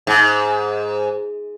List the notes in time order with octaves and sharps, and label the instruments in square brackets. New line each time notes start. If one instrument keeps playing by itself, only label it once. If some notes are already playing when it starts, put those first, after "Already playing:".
[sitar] G#2